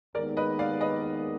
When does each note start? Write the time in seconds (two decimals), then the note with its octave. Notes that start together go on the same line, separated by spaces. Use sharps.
0.15 D#2 D#3 G#3 B3 D#4 A#4 D5
0.37 B4 D#5
0.59 D5 F5
0.81 B4 D#5